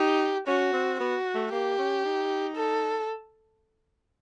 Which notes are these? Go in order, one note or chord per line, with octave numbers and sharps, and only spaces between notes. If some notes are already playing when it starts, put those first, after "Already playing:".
Already playing: D#4 G4
C#4 F#4
C4
B3 F#4
A3
A#3 G4
C#4
D#4
A4